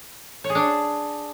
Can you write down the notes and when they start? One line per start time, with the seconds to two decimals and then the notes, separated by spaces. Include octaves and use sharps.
0.44 C#5
0.50 G#4
0.55 D4